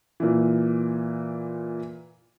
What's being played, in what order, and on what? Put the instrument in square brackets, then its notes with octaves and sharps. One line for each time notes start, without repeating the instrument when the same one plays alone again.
[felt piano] A#2 E3